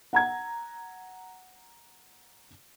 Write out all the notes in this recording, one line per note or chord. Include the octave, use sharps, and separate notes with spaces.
F#5 A#5 G#6